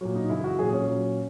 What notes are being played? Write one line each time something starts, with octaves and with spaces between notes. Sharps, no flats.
A#2 F#3
D#4
F#2 C#3 E3 E4
F#4
A#2 F#3 G#4
C#4
A#2 F#3